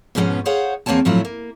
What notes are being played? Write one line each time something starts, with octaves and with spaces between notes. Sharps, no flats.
G#2 B2 F3 G3 B3 C#4
G#4 C5 C#5 F5 F#5
E2 A#3 C4 C#5 G#5 A5
A2 F3 F#3 E4 F4
A#3